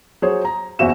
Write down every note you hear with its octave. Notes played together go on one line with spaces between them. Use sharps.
F#3 G#4 C5 C#5
A#5
F#1 E2 F#4 C5 E5 E7